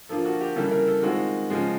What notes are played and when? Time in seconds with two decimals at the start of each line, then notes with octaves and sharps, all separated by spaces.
0.09 F3 A#3 D4 F4 A4
0.25 F#4
0.41 G4
0.56 C#3 E3 G3 A#3 A4
0.71 A#4
0.88 A4
1.02 D#3 G#3 C4 F4 F#4
1.50 C#3 F3 G#3